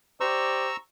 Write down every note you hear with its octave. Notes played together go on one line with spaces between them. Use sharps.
G4 C5 D5 A#5 C#6 E6